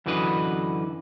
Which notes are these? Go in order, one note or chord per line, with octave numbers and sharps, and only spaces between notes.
F#2 D3 E3 F#4 B4 D#5